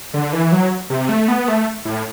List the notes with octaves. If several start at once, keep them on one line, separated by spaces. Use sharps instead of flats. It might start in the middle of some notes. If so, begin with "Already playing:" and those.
D3
E3
F#3
C3
A3
B3
A3
A2